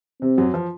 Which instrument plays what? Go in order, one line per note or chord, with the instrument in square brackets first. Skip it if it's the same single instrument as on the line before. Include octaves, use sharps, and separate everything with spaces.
[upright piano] C3 [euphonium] C4
[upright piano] F#2 F#3
F3